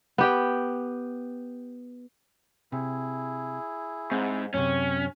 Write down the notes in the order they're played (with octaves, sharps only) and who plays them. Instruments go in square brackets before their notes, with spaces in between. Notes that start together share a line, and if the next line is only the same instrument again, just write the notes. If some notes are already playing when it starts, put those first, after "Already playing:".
[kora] B3 G4 G5
[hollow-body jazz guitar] C3 [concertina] E4 G#4
[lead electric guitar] G#2 [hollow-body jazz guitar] C4
[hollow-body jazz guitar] F#2 A2 C3 [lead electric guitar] C#4